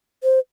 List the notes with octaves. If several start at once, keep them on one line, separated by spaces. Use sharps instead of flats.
C5